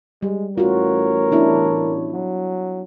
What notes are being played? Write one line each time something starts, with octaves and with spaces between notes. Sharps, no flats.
G3 G#3
A1 F4 F#4 A#4 C#5
B3 D4 E4
F#3